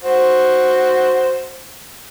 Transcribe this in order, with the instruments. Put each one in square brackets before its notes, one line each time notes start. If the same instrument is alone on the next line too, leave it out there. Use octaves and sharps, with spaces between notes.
[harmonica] F#4 C5